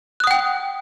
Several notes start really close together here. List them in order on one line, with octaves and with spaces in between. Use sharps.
F#6 D#6 F#5 G5